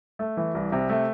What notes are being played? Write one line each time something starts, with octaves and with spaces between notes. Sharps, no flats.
A3
E3
C2
C3
A3